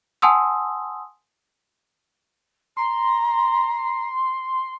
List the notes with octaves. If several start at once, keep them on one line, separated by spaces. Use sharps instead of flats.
F#5 G#5 A5 C6 D#6 E6
A#5 C6